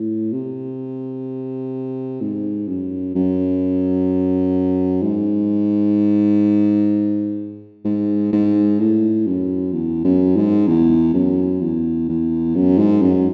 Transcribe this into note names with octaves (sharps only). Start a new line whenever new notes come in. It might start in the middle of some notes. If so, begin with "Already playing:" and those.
Already playing: A2
C3
G#2
F#2
F#2
G#2
G#2
G#2
A2
F#2
E2
F#2
G#2
E2
F#2
E2
E2
F#2
G#2
F#2